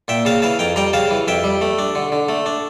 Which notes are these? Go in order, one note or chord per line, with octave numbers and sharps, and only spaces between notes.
A#2 E5 G5
C#3 F5 A5
E3 F5 A5
F2 G5 A#5
G3 G5 A#5
C#3 F5 A5
E3
F2 E5 G5
G3
A3
D4
D3
D3
A3
D4